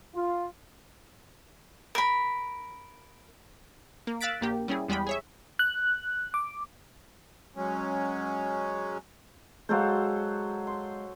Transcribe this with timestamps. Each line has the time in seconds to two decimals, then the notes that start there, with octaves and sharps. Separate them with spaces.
0.15 F4
1.95 A#4 B5
4.07 A#3
4.21 F5 E6 F#6 A6 B6 D7
4.41 A#1 A#3 G4
4.68 G3 C#4 E4 G#4
4.89 E2 G3 G#3 G5 B5
5.07 G#4 C#5 E5
5.59 F#6
6.34 D6
7.56 F#3 G#3 C#4
9.69 F#3 G#3 A4 C5 F5
10.67 C6